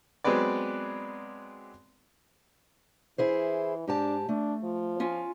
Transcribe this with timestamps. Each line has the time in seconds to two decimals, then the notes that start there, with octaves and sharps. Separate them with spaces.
0.24 F#3 G#3 B3 C4 B4 D5
3.18 E3 E4 G#4 C5
3.88 G#2 D4 G4 A5
4.29 A3 D4
4.64 F3
5.00 C#4 F4